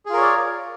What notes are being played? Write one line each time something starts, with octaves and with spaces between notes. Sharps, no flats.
F4 G#4 A#4 C#5 D5